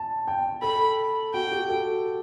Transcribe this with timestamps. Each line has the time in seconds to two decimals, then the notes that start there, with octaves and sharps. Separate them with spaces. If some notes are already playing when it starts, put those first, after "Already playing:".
Already playing: A5
0.27 G5
0.62 A4 B5
1.34 F#4 G5
1.52 G4
1.69 A4